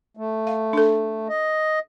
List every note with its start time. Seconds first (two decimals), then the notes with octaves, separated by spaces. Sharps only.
0.17 A3
0.47 F5
0.73 D4 A4
1.29 D#5